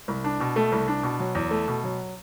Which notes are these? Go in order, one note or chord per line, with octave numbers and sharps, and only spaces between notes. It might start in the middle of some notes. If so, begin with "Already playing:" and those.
C2
D4
B2
A3
C2
D4
B2
F#3
E2
A3
B2
F#3